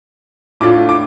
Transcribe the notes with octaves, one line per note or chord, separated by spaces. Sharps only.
A2 A3 D4 F4 D6
D6